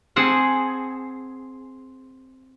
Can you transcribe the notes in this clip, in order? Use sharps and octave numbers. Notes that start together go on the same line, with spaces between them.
C4 G#4 F#5 A5